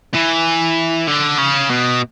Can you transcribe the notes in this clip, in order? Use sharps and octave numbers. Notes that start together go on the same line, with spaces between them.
E3
D3
C#3
B2